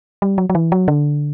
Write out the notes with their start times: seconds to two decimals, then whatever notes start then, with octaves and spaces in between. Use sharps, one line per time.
0.22 G3
0.38 F#3
0.50 F#3
0.55 E3
0.72 F#3
0.88 D3